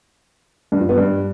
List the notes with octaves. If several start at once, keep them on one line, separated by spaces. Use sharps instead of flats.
G2
F3
B3
G2